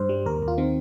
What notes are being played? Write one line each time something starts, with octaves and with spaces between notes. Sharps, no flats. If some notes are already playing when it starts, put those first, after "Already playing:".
Already playing: G2 C5
G3
D#2 A#4
D#2
F4
D#3 C4